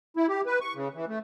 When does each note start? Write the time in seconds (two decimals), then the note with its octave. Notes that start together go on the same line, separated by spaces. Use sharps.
0.17 E4
0.28 G4
0.46 B4
0.61 C#6
0.75 C#3
0.94 E3
1.08 A3